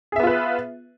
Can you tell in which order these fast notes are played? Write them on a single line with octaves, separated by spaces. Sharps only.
G#4 E5 B3 F4 B4